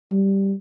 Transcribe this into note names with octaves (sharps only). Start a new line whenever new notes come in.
G3